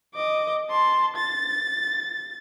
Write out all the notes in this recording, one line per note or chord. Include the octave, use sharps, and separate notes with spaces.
D#5 D6
A5 C6
A6